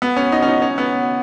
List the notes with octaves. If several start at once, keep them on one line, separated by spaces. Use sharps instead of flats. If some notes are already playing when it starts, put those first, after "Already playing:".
B3
C#4
D#4
C#4
D#4
C#4
B3